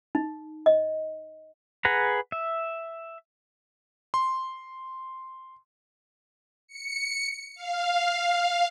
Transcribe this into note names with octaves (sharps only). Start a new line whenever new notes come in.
D#4
D#5
G#4 B4 F#5 A#5
E5
C6
C#7
F5